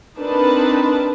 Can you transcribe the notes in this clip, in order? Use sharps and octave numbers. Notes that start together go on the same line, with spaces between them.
C4 D4 D#4 A#4 B4 A5